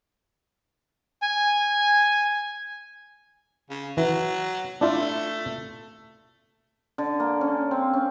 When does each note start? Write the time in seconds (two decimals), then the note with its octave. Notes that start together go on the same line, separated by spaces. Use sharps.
1.22 G#5
3.70 C#3
3.97 E3 F#3
4.81 A3 D4 E4 F4
6.98 D3
7.20 A#3
7.41 C#4
7.71 C4
7.93 C#4